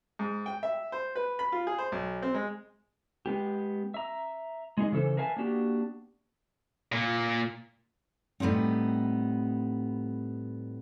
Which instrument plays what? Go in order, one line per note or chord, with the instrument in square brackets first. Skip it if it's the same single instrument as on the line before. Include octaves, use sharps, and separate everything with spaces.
[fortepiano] G#2
G5
E5
C5
B4
B5
F4
G#4
C5
B1
C4
G#3
[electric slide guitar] G#3 B3 G4
E5 A#5
G#3 D#4 G#4 D#5
C#3 E3 A4 C5
A#4 B4 E5 F5 G#5 A5
A#3 B3 D4 F#4 G4
[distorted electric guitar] A#2 A#3
[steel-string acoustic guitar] A2 G3 B3 C4 D#4